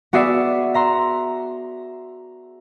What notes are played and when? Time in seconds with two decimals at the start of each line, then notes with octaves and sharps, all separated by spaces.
0.13 B3 F#4 G#4 D5 E5 C7
0.74 E5 A#5 C6